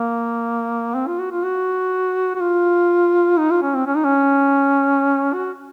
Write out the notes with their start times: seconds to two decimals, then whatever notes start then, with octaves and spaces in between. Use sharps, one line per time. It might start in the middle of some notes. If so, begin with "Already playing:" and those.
Already playing: A#3
0.95 C4
1.07 F4
1.19 F#4
1.31 F4
1.43 F#4
2.35 F#4
2.41 F4
3.38 D#4
3.51 F4
3.62 C#4
3.75 C4
3.87 C#4
3.96 D#4
4.04 C#4
5.33 F#4